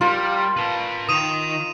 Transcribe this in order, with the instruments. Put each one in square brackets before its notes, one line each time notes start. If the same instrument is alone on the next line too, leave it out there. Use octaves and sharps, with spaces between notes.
[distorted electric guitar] G3 [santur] F4 A#4
[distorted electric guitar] B4 A5
[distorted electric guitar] D#3 [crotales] D#6 D#7 F7